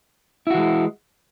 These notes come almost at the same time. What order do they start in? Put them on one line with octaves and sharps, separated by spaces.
E4 F#4 E3 G#3